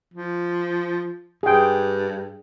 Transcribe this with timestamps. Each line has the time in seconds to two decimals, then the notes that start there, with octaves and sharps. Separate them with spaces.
0.14 F3
1.43 G2 G#4 G5